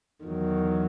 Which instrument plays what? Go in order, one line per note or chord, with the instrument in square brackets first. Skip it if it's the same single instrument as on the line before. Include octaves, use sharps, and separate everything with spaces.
[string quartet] E2 D#3 F#3